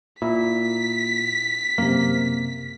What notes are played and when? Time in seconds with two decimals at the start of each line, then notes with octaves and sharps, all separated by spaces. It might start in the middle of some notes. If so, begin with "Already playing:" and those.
0.22 A#2 E4 B6
1.78 F#2 C3 A#3